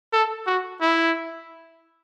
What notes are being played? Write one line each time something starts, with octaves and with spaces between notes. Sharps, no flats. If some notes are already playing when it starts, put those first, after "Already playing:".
A4
F#4
E4